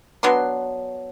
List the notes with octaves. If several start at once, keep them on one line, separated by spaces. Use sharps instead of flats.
F#3 B3 D4 C6